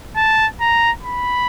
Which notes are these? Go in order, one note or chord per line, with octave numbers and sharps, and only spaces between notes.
A5
A#5
B5